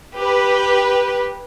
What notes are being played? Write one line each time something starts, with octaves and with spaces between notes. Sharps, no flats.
G4 B4